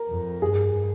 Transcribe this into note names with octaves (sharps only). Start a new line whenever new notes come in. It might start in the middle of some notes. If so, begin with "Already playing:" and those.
Already playing: A#4
F2
G2 G#4